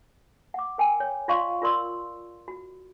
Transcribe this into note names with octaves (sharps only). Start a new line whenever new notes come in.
F#5 D6
A#4 G5 G#5
C#5
F4 D5 D#5 F5 C6 C#6
F4 A#4 D5 C6 E6
F#4